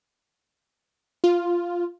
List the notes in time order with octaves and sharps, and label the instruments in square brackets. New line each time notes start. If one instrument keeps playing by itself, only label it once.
[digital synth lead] F4